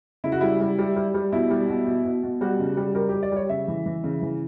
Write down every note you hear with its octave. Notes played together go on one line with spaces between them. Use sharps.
C#3 E4
F#4
G3 E4
G3
G3
G3
G3
B2 E4
G3
B2
B2
B2
B2
G3 F#4
C#3
G3
G3 A#4
G4
G3
D5
G3 C#5
C#3 E5
E3
E3
C#3
E3